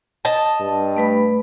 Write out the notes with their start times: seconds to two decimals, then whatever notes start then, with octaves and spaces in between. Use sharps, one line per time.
0.25 D#5 A5
0.61 G2
0.96 A3 B4 B5